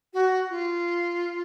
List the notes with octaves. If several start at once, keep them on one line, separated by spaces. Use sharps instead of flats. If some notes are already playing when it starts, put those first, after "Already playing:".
F#4
F4